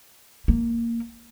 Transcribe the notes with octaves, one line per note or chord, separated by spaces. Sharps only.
A#3